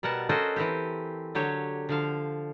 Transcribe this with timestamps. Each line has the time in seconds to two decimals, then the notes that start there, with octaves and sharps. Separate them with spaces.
0.03 B2 G3 A#4 F#5 A5
0.29 C#4 F#4 A4 A#4 C5 D#5
0.56 E3 C4 G4
1.35 D3 F#3 G4 C#5
1.89 D3 F3 F5